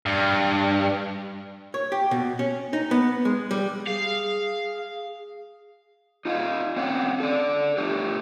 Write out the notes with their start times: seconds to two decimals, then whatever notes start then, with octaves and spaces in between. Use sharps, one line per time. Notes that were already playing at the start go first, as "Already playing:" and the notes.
0.06 G2
1.74 C#5
1.92 G4
2.11 B2
2.39 C#4
2.73 D#4
2.91 B3
3.25 G#3
3.51 G3
3.87 G#4 F5
6.25 D#4 F4 D#5 F5
6.76 C4 C#4 C#5 F5 F#5
7.20 A4 D5
7.77 A3 D4 G4 A4